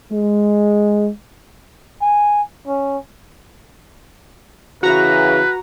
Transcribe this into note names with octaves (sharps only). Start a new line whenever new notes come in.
G#3
G#5
C#4
C#3 E3 F#4 B4 A#5